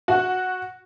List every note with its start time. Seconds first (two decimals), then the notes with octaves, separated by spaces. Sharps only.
0.08 F#4